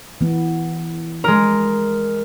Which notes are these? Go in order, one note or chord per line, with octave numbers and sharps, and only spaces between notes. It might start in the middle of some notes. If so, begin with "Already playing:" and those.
E3 B3
G#3 A#4